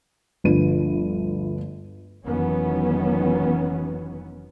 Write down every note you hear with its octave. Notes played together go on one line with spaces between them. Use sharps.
G1 D2 F3 B4 D#7
F1 D#3 E3 F#3 B3 C#4